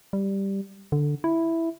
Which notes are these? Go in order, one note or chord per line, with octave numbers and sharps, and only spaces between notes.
G3
D3
E4